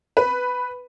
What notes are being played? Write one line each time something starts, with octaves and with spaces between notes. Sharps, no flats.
B4